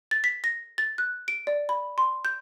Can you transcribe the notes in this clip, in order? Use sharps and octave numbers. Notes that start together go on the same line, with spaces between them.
A6
B6
A#6
A6
F#6
D7
D5
B5
C6
G6